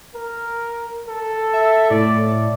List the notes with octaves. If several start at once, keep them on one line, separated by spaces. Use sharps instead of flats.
A#4
A4
E5
A2 D5